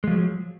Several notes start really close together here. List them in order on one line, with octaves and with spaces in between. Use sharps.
G#3 F3 F#3